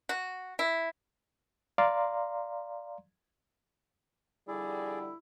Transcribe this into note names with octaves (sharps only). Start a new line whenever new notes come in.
F#4
E4
D5 F5 A#5 C6
F2 D3 G3 E4 G#4 D5